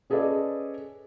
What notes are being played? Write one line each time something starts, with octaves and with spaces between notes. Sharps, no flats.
C#4 G#4 A4 B4 D5 D#5